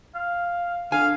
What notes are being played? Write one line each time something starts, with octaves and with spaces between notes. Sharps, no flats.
F5
D3 F5 G#5